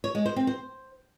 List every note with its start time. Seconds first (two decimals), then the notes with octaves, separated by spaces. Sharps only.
0.04 C#5
0.15 G#3
0.26 C5
0.36 C4
0.47 C5